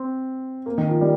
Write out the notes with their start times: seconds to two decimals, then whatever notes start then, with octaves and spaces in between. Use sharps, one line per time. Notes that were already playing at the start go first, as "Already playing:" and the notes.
Already playing: C4
0.66 A#3
0.78 D#3
0.89 F3
1.01 G3